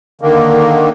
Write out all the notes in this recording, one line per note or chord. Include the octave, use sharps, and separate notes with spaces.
D3 D#3 A#3